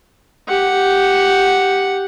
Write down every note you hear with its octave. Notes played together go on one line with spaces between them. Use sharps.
G4 F#5